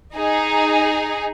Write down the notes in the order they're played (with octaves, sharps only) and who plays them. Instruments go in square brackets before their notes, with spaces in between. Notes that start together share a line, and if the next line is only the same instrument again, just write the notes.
[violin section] D#4 G#4